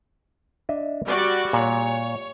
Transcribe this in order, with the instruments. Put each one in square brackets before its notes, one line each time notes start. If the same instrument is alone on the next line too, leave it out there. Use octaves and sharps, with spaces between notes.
[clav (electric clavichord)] D4 D#5 E5
[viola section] G3 F#4 D5 [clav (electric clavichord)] G#5
[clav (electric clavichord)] A#2 [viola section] C#5